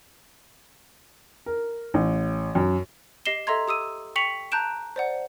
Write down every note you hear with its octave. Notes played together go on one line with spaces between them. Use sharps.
A#4
A1
F#2
G4 D#5 C7 E7 G7
A4 D#5 E5 A#5 C6 G#6
G4 D#6 E6 D#7
G5 C#6 B6 C#7 F7 F#7
A5 A#5 F#6 G6 D7 E7
C5 D5 F#5